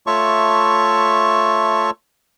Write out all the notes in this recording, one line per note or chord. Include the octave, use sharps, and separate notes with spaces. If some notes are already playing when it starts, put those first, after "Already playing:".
A3 F4 C#5 E5 A5 C#6